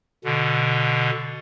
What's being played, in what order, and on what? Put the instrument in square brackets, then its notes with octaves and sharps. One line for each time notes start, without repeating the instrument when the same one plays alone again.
[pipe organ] B2 D3